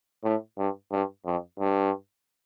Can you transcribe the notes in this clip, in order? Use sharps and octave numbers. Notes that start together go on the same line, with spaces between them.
A2
G2
G2
F2
G2